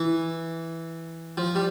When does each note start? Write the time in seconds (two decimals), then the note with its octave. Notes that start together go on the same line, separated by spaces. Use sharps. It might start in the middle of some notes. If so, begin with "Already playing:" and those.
Already playing: E3
1.37 F3
1.55 G3